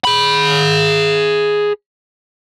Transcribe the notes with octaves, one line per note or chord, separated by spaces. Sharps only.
G#4 B5